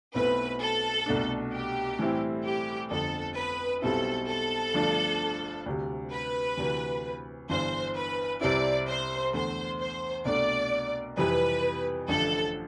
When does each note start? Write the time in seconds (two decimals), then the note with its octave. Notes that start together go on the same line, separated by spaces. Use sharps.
0.14 B1 B2 A3 C4 E4 B4
0.61 A4
1.06 C2 B2 A3 D4
1.53 G4
1.99 A2 E3 G3 C4 E4
2.44 G4
2.90 G1 F2 D3 A4
3.36 B4
3.82 B1 B2 G3 C4 E4 A4
4.28 A4
4.74 G1 G2 F3 A3 D4
5.66 D2 C3 G3
6.12 B4
6.57 D2 C3 E3
7.49 G1 G2 E3 C5
7.96 B4
8.41 C2 C3 G3 C4 E4 D5
8.88 C5
9.33 E2 D3 A3 C5
9.80 C5
10.25 C2 B2 A3 D4 D5
11.17 F2 C3 E3 G3 B4
12.09 A1 G2 D3 F3 A4